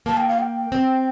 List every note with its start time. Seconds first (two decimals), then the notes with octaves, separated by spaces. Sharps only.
0.06 A#3 A5
0.17 G5
0.28 F5
0.39 G5
0.72 C4